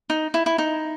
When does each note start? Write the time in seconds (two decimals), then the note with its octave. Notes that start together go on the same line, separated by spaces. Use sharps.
0.10 D#4
0.34 E4
0.46 E4
0.58 D#4